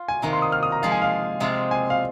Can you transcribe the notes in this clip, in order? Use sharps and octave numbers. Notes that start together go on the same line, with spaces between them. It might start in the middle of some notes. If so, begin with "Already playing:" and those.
Already playing: F4
G#5
C3 D#3 A#3 A#5
C6
D#6
F6
D#6
A#5
F3 G#3 F4 G#4 F5
G#5
F5
C3 G#3 C4 F4
G#5
F5